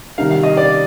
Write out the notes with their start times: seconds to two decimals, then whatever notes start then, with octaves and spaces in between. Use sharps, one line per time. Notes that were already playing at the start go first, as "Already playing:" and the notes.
0.18 C3 D#3 G3 F5
0.31 F5
0.43 D#5
0.57 D5